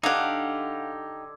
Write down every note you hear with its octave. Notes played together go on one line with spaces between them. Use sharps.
D3 D#4 G4 F5 F#5 D6 E6 G#6